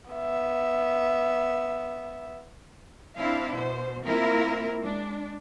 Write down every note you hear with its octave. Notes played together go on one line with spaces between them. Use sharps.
B3 E5
C4 D4 E4 F5
B2 C5
A#3 C4 E4 F4 A#4
G#3 D4